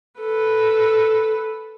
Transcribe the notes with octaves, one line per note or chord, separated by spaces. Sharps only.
A4 B4